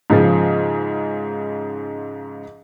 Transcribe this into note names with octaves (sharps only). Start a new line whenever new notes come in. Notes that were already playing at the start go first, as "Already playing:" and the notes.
G#2 C#3 F3